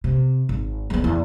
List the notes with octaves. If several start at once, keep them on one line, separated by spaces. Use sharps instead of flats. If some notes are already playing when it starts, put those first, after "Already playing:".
C3
G#1
G#3 B3
E2